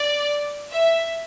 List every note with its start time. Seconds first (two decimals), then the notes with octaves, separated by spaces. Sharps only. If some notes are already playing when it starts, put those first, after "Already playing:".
Already playing: D5
0.70 E5